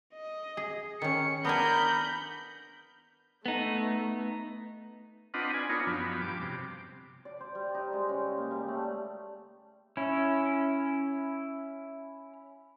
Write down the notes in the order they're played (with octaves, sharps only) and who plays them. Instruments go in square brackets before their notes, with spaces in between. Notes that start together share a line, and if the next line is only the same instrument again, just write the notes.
[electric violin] D#5
[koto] G#4
[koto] D#3 C#4 [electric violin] C#7
[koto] B3 D4 G#5 [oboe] A#4 [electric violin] B5 G6
[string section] A3 [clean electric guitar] B3 D#4
[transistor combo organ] C4 D4 F4 B4 D#5 F#5
B4 D5 G#5
B3 D4 D#4 F4 A#4 C#5
F#2 F3 B3
G2 D6
C3
[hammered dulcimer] D5
C5
G3
D#4
G#3
C#3
A#3
G3
A3
[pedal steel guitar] C#4 E4